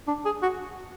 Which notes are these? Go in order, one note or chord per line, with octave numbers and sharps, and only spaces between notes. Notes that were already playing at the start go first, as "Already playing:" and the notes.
D4
G#4
F#4